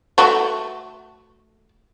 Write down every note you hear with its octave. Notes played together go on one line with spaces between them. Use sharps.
A3 F#4